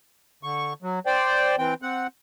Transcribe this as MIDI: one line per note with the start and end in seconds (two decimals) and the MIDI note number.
0.43 0.73 50
0.43 0.73 85
0.82 0.99 54
1.06 1.56 72
1.06 1.56 74
1.06 1.56 79
1.58 1.74 52
1.58 1.74 60
1.58 1.74 79
1.82 2.07 60
1.82 2.07 78